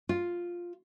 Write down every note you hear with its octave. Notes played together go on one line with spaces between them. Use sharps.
F4